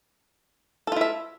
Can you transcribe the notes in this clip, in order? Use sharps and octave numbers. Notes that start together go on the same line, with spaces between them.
E4 F4 A4 E5